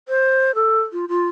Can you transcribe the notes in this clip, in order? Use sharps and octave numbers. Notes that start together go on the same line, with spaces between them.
C5
A4
F4
F4